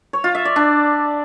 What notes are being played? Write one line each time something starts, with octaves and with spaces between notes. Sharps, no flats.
C#5
F4
E5
D5
D4